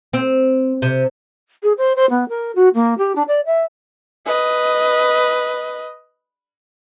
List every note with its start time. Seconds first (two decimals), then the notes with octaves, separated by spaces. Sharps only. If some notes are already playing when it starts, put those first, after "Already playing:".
0.13 C4
0.82 C3
1.63 G#4
1.78 C5
1.96 C5
2.10 B3
2.29 A#4
2.55 F#4
2.74 A#3
2.98 G4
3.16 D4
3.28 D5
3.46 E5
4.26 B4 D#5